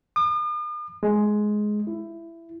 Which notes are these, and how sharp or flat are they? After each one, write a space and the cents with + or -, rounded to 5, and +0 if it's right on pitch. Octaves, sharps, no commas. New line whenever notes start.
D#6 -45
G#3 +10
E4 +15